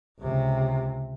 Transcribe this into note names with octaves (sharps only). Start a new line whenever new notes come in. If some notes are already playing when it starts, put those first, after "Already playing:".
C#2 C3